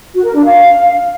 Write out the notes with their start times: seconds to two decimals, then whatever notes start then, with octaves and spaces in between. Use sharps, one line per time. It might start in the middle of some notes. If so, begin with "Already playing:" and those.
0.14 F#4
0.24 A#4
0.34 D4
0.45 F5